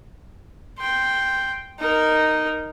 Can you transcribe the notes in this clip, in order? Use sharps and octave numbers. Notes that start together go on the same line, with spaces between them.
G5 C6
D#4 A#4